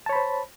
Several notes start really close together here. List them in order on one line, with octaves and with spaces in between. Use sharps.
A5 C#5 B5 C5